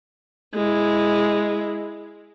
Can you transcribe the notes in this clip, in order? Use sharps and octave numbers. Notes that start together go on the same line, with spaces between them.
G#3 E4